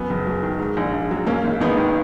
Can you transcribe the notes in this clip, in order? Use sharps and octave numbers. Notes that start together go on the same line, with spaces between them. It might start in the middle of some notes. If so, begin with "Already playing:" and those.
Already playing: F#2 B3
F#1
F#3
D#3
G#2
A#1
A#1
F#3
F#2 A#3 C#4
G#1
G#1 B3 D#4
D#3